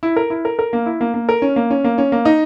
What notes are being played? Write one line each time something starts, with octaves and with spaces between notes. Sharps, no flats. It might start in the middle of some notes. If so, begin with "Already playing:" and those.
E4
A#4
E4
A#4
A#4
A#3
E4
A#3
A#3
A#4
C#4
A#3
C#4
A#3
C#4
A#3
D#4